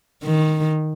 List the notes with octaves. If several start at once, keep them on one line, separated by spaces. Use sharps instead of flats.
D#3